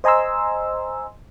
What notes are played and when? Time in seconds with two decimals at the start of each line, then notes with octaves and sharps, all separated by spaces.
0.04 C5 D#5 G#5 A#5 C6 E6